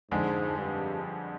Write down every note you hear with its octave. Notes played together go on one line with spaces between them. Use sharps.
F2 G#2 D3 G#3
G2